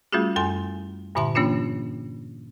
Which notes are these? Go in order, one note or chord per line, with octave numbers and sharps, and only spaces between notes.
G3 A3 C#4 F4 F#4 G#4
F#2 A4 G#5 C6
G2 A#2 D3 E5 A5 C6
E3 A#3 C#4 D4 F4